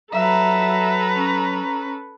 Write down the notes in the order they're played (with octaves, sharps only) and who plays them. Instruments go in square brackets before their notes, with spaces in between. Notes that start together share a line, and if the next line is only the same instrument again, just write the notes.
[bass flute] F#3 [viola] A4 B4 [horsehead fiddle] E5 [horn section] A#5
[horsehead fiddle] C#4